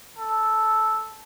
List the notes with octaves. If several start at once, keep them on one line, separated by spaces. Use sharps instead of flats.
A4